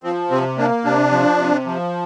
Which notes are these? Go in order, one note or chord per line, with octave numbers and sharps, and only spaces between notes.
F3 C4
C3 C4
A#3 D4
C3 D4
F3
C3
F3